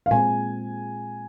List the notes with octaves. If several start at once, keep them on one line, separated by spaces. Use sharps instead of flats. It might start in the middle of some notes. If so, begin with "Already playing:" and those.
F5
A#2 G#3 C4 G#5